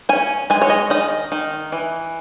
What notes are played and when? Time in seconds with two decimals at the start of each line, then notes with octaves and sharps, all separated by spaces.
0.09 C#4 G#5
0.50 G#3 G#5
0.62 C#5
0.70 D#5
0.90 D#3 D#5
1.32 D#3
1.72 E3